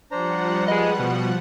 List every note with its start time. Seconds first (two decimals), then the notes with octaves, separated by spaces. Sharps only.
0.11 F3 G3 D4 C5 F#5 A#5
0.68 G#4 B4 D#5
0.99 B2